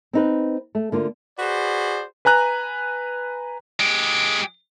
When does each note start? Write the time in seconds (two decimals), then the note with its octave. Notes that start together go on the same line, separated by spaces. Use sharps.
0.13 C4 D#4 B4
0.75 A3
0.92 D3 A#3 F4
1.39 F#4 G#4 B4 C5 D5
2.25 B4 G#5 A#5 F#6
3.80 G#3 G4